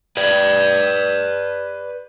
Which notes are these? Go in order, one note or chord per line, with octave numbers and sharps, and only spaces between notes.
B4 D5